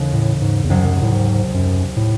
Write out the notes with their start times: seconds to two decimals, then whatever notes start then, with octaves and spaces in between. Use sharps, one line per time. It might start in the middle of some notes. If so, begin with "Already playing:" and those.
Already playing: D#2 C#3 E3 A3
0.13 A2
0.41 G#2
0.64 E2
0.70 C2 F#2 C3 F#3 C4
1.02 A2
1.12 G#2
1.54 F#2
1.96 A2